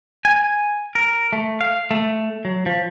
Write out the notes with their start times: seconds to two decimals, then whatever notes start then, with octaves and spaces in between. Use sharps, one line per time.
0.25 G#5
0.95 A#4
1.33 A3
1.61 F5
1.91 A3
2.45 F#3
2.66 F3